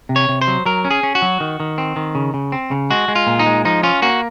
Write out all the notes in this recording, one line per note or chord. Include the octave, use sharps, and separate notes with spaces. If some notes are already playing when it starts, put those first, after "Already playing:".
C3
C#5
C3
C5
F#3
F#3 A#4
C#4
G#4
C#4
F#4
F#3
D#3
D#3
C4
D#3
C#3
C#3
C4
C#3
G#3 F#4
G#3
F4
A#2
D#4
G#3
F3 D#4
C#4 F4
A#3 F#4